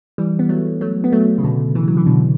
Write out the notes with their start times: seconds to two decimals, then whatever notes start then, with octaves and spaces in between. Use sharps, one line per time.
0.18 E3 G3
0.39 B3
0.49 F#3 A3
0.81 F#3 A3
1.04 B3
1.13 F#3 A3
1.38 C#3
1.43 B2 D3
1.75 C#3 E3
1.88 F#3
1.97 E3
2.06 B2 D3